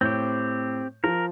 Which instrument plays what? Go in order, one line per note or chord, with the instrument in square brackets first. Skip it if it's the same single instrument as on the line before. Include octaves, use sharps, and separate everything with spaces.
[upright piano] A2 G6 [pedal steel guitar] C4 G4
[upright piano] F3 [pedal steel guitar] A#4